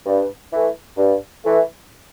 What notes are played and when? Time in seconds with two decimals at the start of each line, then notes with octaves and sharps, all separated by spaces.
0.06 G2
0.51 E3 A3
0.97 G2
1.43 E3 A3